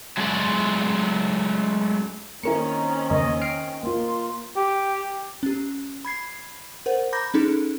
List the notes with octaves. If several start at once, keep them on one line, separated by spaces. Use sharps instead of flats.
F#3 G#3 A3 C#4 B4 D5
D#3 A#3 C4 C#4 E4 A#4 A#5 C#7
E2 C#3 A#3 D#5
G5 F6 C7 D7
A#3 F4 C6
G4
C#4 G4
B5 G#6 C7
A#4 C5 F#5
A#5 B5 D6 G6 A#6
C#4 D#4 G#4 A4